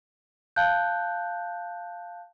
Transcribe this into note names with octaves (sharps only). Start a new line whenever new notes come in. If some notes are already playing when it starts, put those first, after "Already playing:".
F5 A5 F#6 G6